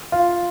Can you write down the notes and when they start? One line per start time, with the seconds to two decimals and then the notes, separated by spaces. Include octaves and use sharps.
0.12 F4